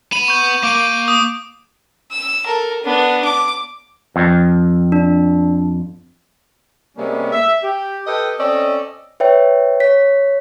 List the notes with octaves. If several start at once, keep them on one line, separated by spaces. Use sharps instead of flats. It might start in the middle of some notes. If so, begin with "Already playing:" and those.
B3 B5 D#7
C#6 G6
A#3 D6 D7 D#7
D#6
E6
A4 A#4
B3 D4
D6
F2
D4
C3 G3 G#3 A#3 B3 C#4
E5
G4
G4 A4 B4 D#5 G5
C4 C#4 A4 D5 D#5
B4 C#5 E5 G5
C#5 B6